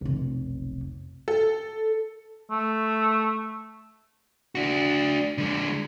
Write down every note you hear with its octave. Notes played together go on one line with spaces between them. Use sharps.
F1 B1
A4
A3
D4 F#4
D3 G#3